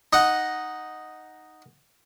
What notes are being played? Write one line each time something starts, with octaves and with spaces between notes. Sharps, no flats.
D#4 D#5 F#5